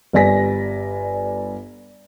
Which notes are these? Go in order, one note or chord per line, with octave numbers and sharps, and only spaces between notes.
G1 G3 D5 G#5 A#6 B6